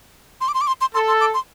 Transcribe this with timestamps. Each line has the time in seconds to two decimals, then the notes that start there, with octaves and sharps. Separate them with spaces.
0.41 C6
0.48 D6
0.54 C6
0.61 D6
0.67 C6
0.81 C6
0.94 A4 C6
1.08 C6
1.21 D6
1.34 C6